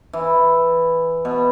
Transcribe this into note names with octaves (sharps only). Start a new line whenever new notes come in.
E3
B2